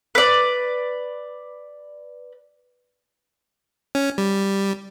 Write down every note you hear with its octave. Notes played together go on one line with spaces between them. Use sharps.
B4 D5
C#4
G3